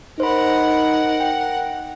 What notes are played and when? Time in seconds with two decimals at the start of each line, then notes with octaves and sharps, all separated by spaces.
0.20 D#4 A#4 C5 F#5 B5
1.20 G5